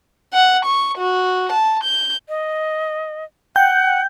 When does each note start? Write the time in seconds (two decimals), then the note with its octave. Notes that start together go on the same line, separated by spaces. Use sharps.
0.33 F#5
0.66 C#6
0.98 F#4
1.53 A5
1.84 G6
2.29 D#5
3.56 F#5 G5 G6